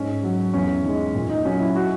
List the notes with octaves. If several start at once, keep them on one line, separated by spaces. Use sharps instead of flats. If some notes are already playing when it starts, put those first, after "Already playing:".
Already playing: G#2 C#4
F#3
E2 C#4
D#3 G#3
A#2
D#4
F#3 C#4
E4
F#4